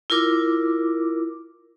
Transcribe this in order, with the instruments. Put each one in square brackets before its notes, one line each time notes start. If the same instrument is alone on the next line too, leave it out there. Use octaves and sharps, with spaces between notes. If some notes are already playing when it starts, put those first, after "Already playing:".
[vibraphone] E4 F4 A#4 D6